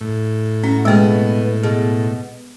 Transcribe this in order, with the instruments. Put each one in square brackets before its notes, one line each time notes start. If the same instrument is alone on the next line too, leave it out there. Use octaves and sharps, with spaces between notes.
[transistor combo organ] A2
[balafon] C#4 [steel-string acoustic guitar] F#4
[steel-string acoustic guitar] B2 B3 [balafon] G#3 A#3 G#4
[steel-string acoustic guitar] B2 [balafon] G#4